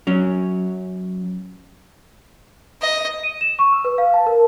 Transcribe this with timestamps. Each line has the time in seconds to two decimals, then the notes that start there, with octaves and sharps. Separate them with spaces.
0.07 F#3 C#4
2.82 D#5
3.23 D#7
3.41 E7
3.59 C#6
3.72 E6
3.85 B4
3.98 F5
4.14 A5
4.27 A#4